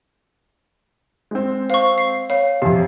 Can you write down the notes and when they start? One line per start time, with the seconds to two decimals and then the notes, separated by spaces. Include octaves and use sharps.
1.31 G#3 C4
1.70 C5 F5 C#6
1.98 C7
2.30 C#5 F5
2.62 F2 C3 G4